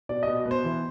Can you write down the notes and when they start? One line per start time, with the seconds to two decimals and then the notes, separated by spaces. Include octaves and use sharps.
0.09 B2 D5
0.23 B2 D#5
0.46 B3
0.51 C5
0.64 E3